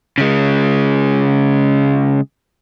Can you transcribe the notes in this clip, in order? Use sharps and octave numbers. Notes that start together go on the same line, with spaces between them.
C#3 G#3